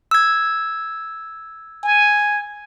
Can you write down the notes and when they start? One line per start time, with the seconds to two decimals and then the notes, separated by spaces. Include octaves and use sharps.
0.11 E6 G#6
1.84 G#5